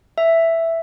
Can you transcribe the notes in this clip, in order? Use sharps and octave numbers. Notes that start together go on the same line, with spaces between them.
E5